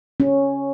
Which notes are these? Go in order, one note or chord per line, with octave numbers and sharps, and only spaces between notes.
C#4